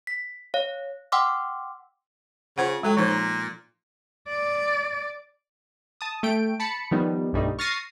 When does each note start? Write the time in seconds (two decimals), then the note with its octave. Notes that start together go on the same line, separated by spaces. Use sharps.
0.07 B6
0.54 C#5 F5
1.12 F#5 G5 C6 D6 E6 F6
2.58 C#3 F4 C5 F#5
2.83 F#3 G#3 A4 G5
2.97 A#2 F3 D#4 C5
3.08 A#5
4.29 D5
6.01 A5 D#6
6.23 A3 G5 D7
6.60 A5 B5 C#7
6.91 D#3 F3 G3 B3 D#4
7.33 B1 G2 G3 A3 D#4
7.59 C#6 F6 A6 A#6 C7 D#7